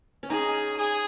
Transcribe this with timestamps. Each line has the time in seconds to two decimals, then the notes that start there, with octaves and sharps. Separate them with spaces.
0.23 C#4
0.29 D#4 G#4
0.77 G#4